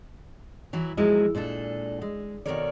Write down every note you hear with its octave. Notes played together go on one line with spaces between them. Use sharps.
E3 F#3 E4
E2 A#2 F3 F#3 G#3 E4
A#2 G#3 D4 A4
G#3
B2 D#3 A4 A#4 C#5 D5